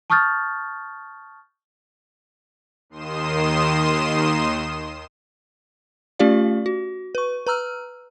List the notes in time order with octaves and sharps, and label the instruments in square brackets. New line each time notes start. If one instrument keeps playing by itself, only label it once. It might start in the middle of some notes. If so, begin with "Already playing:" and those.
[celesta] A5 C#6 D#6 F6 G6 A6
[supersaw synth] D#2 D#3 C6 D#6 E7
[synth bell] A3 C#4 F4 G4 D5 F5
F#4
B4 C#6
B4 A#5 E6 F6